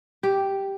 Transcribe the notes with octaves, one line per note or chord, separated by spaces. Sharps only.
G4